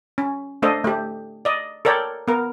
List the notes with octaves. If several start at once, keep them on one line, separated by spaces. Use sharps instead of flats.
C#4
A3 D4 A4 C5 D#5
A3 G4
D5 D#5
A4 A#4 C#5 D5 G5
B3 A#4